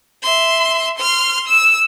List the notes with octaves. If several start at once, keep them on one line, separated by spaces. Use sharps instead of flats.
E5 C6
C6 F6
E6